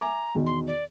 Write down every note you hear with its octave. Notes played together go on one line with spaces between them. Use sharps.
E5 G#5 A#5 D6
E2 B2 D#3
C6
D5